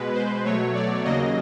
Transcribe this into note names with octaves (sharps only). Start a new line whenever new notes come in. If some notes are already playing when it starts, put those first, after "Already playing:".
Already playing: B2 G#3 B4
C5
B2 F#3 A3 C#5
D5
D#2 C#3 F#3 A#3 D#5